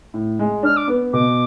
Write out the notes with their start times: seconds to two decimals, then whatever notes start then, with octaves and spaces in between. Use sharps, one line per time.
0.14 A2
0.39 G#3
0.63 D4 F6
0.76 D6
0.88 B3
1.13 B2 D6